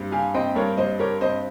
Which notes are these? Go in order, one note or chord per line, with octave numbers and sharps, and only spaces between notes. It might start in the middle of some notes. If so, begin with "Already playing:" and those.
Already playing: G2 G3 C4
G4 F5 G#5
C4 D#5 G5
G2 A#4 C#5
G3 C5 D#5
G4 A#4 C#5
C4 C5 D#5